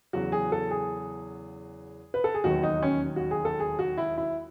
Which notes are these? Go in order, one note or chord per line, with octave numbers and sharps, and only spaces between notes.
E2 C#3 F#3 F#4
G#4
A4
G#4
B4
A4
G#4
E1 D#2 D#3 F#3 F#4
D#4
C#4
F#4
G#4
A4
G#4
F#4
E4
E4